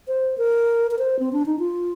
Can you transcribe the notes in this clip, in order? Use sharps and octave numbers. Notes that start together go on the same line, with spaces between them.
C5
A#4
A#4
C5
C4
D4
D#4
F4